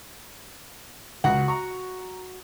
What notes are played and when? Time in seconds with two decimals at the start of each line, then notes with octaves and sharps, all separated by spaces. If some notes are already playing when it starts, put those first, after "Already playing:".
1.24 C#2 F#4 F#5
1.48 A#5 C#6